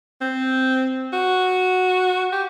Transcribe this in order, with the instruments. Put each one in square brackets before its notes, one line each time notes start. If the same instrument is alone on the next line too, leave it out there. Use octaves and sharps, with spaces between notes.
[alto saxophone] C4
F#4
G4